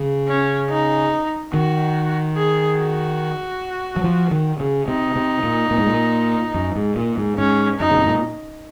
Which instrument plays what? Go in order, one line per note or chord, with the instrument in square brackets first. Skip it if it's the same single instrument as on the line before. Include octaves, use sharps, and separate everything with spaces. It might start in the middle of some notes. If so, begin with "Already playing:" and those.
Already playing: [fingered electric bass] C#3
[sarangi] C#4
D#4
[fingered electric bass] D#3 [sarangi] F#4
[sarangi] G#4
F#4
[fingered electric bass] F#3
F3
D#3
C#3
[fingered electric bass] C3 [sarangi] D#4
[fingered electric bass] C3
A#2
A#2
G#2
A#2
F#2
G#2
A#2
G#2
[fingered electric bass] G#2 [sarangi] C#4
[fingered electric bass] F#2 [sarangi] D#4
[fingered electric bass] C#3
C3
A#2